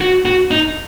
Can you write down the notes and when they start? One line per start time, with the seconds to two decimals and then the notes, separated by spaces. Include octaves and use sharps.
0.01 F#4
0.25 F#4
0.51 D#4